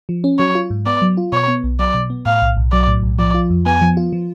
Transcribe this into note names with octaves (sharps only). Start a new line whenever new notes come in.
F3
C#4
F#3 C#5
F4
G#2
B3 D5
F#3
F4
B2 C#5
B3
B1
F#3 D5
B2
B3
A2 F5
B1
B1
F#3 D5
A2
B1
F3 D5
F4
F2
B3 G#5
F3
F4
F3